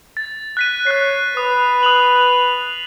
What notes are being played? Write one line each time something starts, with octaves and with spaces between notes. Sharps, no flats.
A6
F#6 B6 D#7
C#5 F#6 C7
B4 D#6
D#6 F7 F#7